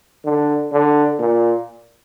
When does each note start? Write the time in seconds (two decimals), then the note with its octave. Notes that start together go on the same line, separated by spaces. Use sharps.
0.25 D3
0.72 D3
1.19 A#2